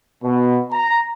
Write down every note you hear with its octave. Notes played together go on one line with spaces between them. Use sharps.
B2
A#5